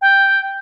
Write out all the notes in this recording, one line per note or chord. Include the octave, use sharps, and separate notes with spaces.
G5